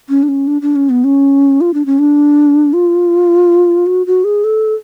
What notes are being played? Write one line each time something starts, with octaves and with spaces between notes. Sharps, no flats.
C#4
D4
C#4
D4
D4
C#4
B3
C#4
F4
D4
C#4
D4
F4
F#4
F#4
G#4
A4